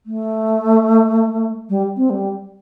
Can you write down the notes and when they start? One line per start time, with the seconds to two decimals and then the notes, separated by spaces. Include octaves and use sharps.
0.06 A3
1.69 G3
1.97 C4
2.10 G3